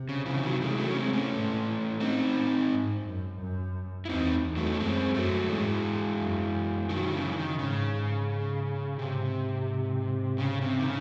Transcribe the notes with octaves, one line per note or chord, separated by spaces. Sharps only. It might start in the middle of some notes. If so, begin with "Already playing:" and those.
Already playing: C3
C#3
C#3 E3
E3
D#3 F#3
E3 G#3
F#3 A3
C#4
G#3 C4
A3 C#4
A2
C4 D#4
G#2
F#2
F#2
E4
E2 C4 D#4
E2
F#3 A3
D#4
C#4
F#2 G#3 C4
F#2 F#3 A3
G#2 E3 G#3
F#2
D#3 F#3
C#3 E3
D#3
G#2 C#3
G#2 C3
C#3
C3
D#3
C#3